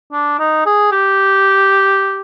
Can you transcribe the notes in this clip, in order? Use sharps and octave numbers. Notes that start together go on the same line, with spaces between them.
D4
D#4
G#4
G4